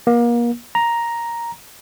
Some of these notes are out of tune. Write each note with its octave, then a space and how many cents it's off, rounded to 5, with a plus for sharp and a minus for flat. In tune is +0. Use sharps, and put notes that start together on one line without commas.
A#3 +30
A#5 +5